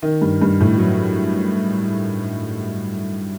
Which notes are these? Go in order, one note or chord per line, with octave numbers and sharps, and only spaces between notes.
D#3
G2
G2
A2
F#3